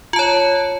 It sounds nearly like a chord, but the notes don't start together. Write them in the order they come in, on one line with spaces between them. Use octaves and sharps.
F4 A5 C#5